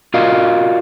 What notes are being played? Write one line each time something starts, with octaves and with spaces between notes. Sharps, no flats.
F4 F#4 A#4 D5 D#5 F5